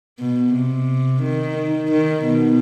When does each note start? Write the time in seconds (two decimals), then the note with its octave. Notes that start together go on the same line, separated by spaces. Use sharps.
0.20 B2
0.53 C3
1.23 D#3
1.92 D#3
2.25 B2